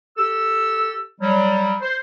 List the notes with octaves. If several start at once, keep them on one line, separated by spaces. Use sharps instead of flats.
G4 A4 E6
F#3 G3
C5